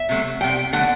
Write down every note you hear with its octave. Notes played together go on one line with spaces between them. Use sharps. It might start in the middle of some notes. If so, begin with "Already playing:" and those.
Already playing: E5
C3 F#3 A3
C3 G3 G5
D3 F#3 A3 F#5